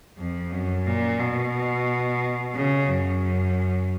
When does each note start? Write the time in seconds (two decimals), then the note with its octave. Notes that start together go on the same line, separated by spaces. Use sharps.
0.18 F2
0.51 F#2
0.86 A#2
1.19 B2
2.55 C#3
2.88 F#2